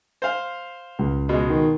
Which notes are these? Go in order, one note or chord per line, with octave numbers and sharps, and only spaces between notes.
C5 F5
C#2
B2 G#3
D#3